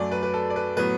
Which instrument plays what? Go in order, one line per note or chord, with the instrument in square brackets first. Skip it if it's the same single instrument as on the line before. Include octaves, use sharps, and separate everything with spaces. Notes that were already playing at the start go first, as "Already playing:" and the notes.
Already playing: [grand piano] F#2 F#3 A3 D5
B4
B4
A4
D5
B4
A2 F#3 B3 B4